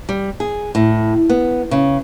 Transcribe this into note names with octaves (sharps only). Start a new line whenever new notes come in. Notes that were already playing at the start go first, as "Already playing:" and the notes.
G3
G#4
A2
B3
C#3